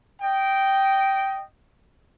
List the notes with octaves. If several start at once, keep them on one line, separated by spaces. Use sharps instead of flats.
D#5 G5